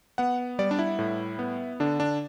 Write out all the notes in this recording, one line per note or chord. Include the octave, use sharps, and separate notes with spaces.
B3 F#5
G3 D5
D4
E4
A2
B3
D3 D4
D4